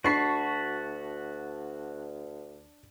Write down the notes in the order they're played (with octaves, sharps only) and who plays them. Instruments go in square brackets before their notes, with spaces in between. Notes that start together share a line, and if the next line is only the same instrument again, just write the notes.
[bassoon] D2 [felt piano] D4 [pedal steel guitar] F#4 A5 B5 [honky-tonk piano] C#6 C7